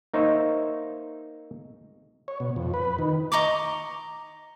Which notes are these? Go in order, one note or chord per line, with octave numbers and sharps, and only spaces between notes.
A#3 D#4 C5 C#5 E5
C#5
B2
F2
B4
D#3
D#5 A#5 C#6 D6